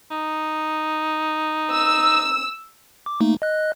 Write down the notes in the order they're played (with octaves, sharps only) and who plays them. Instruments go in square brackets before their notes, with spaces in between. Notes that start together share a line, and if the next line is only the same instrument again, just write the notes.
[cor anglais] D#4
[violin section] E6
[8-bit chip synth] D6
A3 A#3 D#4
D#5 F#6